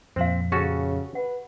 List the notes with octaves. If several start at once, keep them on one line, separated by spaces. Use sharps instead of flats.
F2 A#2 F3 C4 C5 F5
C#3 C#4 F#4 G4 A4
B4 F#5